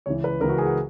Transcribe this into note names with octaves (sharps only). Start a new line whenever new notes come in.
C#2 C#3 E3 C#5
B4
C#2 C#3 E3 A#4
F#4
G#4
F#5